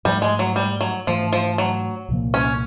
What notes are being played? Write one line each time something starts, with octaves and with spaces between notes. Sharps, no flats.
G#2 F3 G3 A3
G#3
F#3
G3
F#3
G#2 E3 F3 A3 D4
F3
F#3
C2 A#2 F3 A#3
C#4